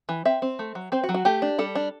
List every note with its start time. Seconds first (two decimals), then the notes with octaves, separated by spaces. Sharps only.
0.09 E3
0.25 C4 E5
0.42 C4
0.59 A3
0.75 F#3
0.92 C4 C5
1.04 F#4
1.09 F#3
1.14 F#4
1.25 A3 G4
1.42 D4
1.58 G3 A4
1.75 D4